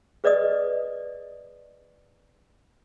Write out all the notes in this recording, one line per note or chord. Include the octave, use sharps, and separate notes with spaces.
G#4 B4 D5 D#5 D#6